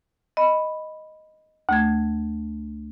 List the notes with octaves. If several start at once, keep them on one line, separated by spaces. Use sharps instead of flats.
D#5 B5
D2 A3 G#6